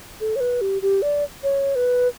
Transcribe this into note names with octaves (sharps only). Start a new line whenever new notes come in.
A4
C#5
B4
G4
G4
D5
C#5
B4